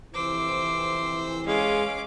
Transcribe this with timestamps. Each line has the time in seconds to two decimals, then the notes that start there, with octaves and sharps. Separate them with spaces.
0.14 F2 C3 E3 C5 D6 E6
1.47 G#3 C#4 F5 D6